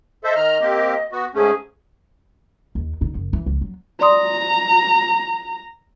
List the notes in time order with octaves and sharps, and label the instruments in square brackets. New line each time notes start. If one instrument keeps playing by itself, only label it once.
[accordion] A4 C5 E5 [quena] D#5
[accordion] D#3 A#5 F6
A#3 C4 G4
B3 F#4
[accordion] G#2 A3 C#4 [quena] G#4
[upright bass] D#2
D3 D#4
F#1
E3
C#2
F#3
[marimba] D5 C6 D#6 [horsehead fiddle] A#5